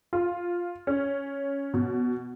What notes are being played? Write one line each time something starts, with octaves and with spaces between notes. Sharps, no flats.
F4
C#4
B2